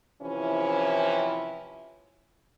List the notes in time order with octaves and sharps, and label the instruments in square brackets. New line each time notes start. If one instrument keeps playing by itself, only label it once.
[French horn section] C3 E3 F3 C#4 E4